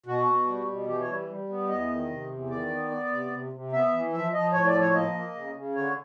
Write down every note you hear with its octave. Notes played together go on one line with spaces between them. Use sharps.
B2 F#4
B2
G3
B2
E3 G4
C#5
G3
G3
B3
E2 D#5
D#3
C3
E2
D#3 D5
B3
B3
C3
C3
C3
B3 E5
E3
F3 E5
F3 D#5
A2 C#5
D5
F3
C#5
A#3 D#5
A#3
C#3
C#3
D3 C#5